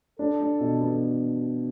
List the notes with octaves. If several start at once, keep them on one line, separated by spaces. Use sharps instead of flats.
D4 A4
D4
B2
B3